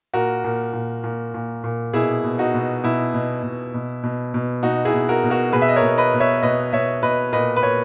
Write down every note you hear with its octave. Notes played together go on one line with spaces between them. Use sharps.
A#2 F#4 A#4
A#2
A#2
A#2
A#2
A#2
B2 E4 G#4
B2
D#4 F#4
B2
B2 E4
B2
B2
B2
B2
B2
B2 D#4 F#4
E4 G#4
B2
F#4 A#4
B2
F#4 A#4
B2 G#4 B4
E5
D#5
A#4 C#5
B2
B4 D#5
B2
C#5 E5
B2 B4 D#5
B2 C#5 E5
B2 B4 D#5
A#2 B4 D#5
B4
A#2 C#5